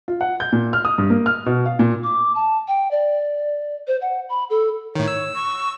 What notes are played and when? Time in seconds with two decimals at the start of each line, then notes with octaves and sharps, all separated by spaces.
0.08 F4
0.21 F#5
0.40 G6
0.52 A#2
0.73 F6
0.85 D#6
0.98 G2
1.10 A#3
1.26 F6
1.46 B2
1.66 F5
1.79 A#2
2.03 D6
2.35 A5
2.68 G5
2.91 D5
3.87 C5
4.01 F#5
4.29 B5
4.50 A4
4.95 A2 D#3 C#5
5.08 E6
5.35 C#6